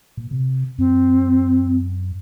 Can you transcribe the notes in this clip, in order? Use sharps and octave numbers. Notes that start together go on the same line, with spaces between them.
A#2
C3
F#2 C4